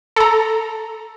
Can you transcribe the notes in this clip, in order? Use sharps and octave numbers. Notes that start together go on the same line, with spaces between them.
A4 A#5